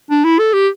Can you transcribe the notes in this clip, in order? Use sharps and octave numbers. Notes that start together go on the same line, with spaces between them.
D4
E4
A4
G4